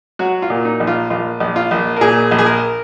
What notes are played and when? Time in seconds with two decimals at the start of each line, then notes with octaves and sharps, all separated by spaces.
0.19 F#3 F#4
0.42 F4
0.50 A#2
0.65 D#4
0.80 A#1
0.87 F4
1.10 A#1 F4
1.40 A#1
1.56 F4
1.71 A#1
1.97 A#4
2.01 A#2 G#4
2.31 A#1
2.39 G#4
2.46 A#4